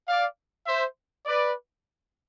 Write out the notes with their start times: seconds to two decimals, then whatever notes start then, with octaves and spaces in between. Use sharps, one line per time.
0.08 D5 F5
0.67 C5 E5
1.26 B4 D5